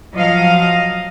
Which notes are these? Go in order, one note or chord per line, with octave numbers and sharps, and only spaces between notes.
F3 F#3 D#5 F5